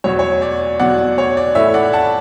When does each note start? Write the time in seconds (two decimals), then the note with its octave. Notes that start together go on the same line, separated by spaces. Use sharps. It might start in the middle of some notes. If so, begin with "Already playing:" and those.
0.04 E2 B2 F#3 C#5
0.19 C#5
0.42 D5
0.79 E2 B2 F#3 D5 F#5
1.18 C#5
1.37 D5
1.55 A2 E3 A3 E4 C#5 E5
1.74 D5 F#5
1.93 F#5 A5